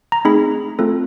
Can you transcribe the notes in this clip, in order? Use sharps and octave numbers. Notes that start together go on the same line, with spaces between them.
A#5
A3 C4 D#4 G#4 B5
A3 C4 F4 A4